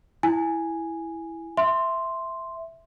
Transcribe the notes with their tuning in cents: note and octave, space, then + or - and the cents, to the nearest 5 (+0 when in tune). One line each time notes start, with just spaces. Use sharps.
E4 +0 G#5 +0
E5 +0 C6 +0